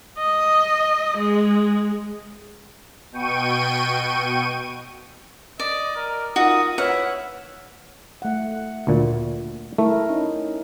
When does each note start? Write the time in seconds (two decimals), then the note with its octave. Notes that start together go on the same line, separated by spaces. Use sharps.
0.18 D#5
1.17 G#3
3.12 B2 G5 C#6 D#7
5.60 D5 D#5
5.96 A#4
6.36 D#4 F4 F#4 A#4 D#6
6.78 E4 B4 C#5 F#5 F6
8.22 A3 F#5
8.87 D2 A#2
9.78 A3 E4 A#4
10.09 C#4 D#4